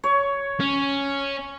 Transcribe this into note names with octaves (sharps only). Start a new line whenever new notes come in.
C#5
C#4